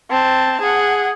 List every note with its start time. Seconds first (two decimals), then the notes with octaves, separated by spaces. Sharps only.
0.11 C4 A5
0.61 G#4 F#5